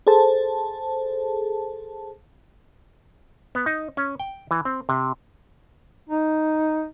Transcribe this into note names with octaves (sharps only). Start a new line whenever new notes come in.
G#4 A4 C5 A5
B3
D#4
C#4
G5
E3
C4
C3
D#4